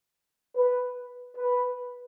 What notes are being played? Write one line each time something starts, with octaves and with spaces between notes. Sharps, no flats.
B4
B4